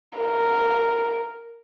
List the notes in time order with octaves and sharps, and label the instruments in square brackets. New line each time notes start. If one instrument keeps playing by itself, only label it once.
[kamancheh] A#4